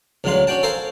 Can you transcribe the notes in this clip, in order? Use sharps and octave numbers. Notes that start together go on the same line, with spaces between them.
C#2 A2 D3 F#3 F4 C6
C#4 D4 F#4 G5 A5
A4 A#4 C5 F5 G#5 A5